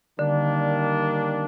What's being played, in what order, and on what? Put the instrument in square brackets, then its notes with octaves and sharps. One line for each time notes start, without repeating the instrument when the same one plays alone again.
[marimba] D3 [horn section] D#3 G3 A#3 D4